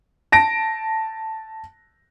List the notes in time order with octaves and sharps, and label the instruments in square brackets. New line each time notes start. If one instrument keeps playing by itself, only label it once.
[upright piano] A5 A#6 D7